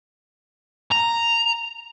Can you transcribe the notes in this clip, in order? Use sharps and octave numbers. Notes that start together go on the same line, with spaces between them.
A#5